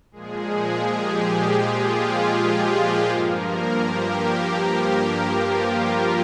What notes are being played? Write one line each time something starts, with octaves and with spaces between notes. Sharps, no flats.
A#2 F3 G#3 G#4
G4
F4
G4
G#3 G#4
G2 F3 A#3 A#4
G4
F4